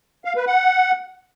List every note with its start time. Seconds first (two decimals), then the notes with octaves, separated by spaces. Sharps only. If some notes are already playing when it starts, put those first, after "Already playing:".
0.25 F5
0.36 B4
0.47 F#5